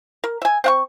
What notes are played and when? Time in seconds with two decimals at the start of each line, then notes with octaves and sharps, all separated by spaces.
0.24 A#4
0.42 E5 G#5
0.64 C4 F#5 C#6